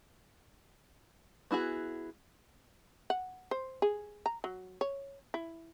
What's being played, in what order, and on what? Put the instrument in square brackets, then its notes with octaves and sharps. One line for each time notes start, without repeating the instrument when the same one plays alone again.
[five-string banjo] B3 E4 F#4 G#4
[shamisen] F#5
C5
G#4
A#5
F#3
C#5
E4